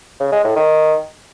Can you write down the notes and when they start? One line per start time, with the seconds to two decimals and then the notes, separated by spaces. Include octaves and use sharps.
0.20 C#3
0.32 G#3
0.44 A2
0.56 D#3